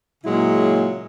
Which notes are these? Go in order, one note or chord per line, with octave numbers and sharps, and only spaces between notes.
A#2 C#3 F#3 G#3 E4